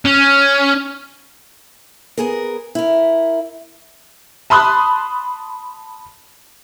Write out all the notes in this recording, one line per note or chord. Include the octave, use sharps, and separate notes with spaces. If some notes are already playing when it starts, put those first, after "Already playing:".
C#4
B3 G#4 A#4
E4 A#4
A5 B5 C6 D#6 F#6